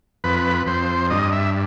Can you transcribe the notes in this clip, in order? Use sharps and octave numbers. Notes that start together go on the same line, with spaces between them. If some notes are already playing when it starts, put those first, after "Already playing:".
F2 B4
F2 C5
G2 D#5
E5